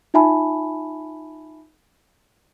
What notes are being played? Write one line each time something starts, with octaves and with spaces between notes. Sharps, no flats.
D#4 F4 E5 G#5 A5 B5